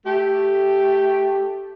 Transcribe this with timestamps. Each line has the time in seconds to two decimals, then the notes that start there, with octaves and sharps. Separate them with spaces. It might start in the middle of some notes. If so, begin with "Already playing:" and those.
0.06 A3 G4